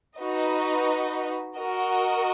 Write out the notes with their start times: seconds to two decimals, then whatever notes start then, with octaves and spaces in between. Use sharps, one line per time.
0.17 D#4 F#4 B4 D#5
1.56 F#4 A#4 D#5